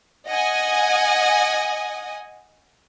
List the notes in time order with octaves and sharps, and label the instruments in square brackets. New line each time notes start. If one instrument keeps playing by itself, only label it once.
[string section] D#5 F#5 G#5 D#6